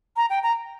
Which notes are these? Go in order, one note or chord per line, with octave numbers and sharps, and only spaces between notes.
A#5
G5
A#5